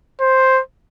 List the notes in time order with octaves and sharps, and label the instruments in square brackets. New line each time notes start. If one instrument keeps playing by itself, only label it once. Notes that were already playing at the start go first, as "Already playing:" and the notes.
[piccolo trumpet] C5